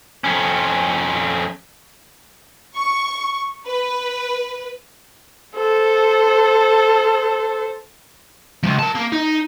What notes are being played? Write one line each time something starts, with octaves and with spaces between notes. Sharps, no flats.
F2 C#4
C#6
B4
A4 C5
C#2 F3
A#4 A5
A#3
D#4